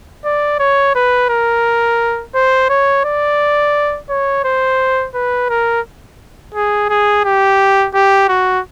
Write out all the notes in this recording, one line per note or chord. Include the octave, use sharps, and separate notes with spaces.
D5
C#5
B4
A#4
C5
C#5
D5
C#5
C5
B4
A#4
G#4
G#4
G4
G4
F#4